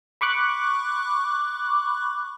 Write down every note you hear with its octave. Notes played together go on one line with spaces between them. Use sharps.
B5 C#6 D6 F#6